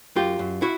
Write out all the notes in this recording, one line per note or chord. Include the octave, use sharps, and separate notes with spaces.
F#2 F4 G4
F#2
E4 F#4